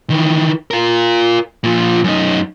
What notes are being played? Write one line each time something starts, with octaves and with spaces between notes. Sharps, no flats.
D#3 E3
F4 A#4
A#2 F3
F#2 D#4